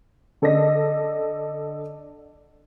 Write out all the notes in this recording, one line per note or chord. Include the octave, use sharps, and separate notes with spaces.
D3 A4 D5 D#5 A#6